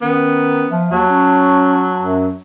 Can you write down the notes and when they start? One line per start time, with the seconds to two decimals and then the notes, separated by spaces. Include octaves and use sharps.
0.02 D#3 B3 C#4
0.71 F3 E5
0.92 D#2 F#3 A5
1.10 C#4
2.00 F#2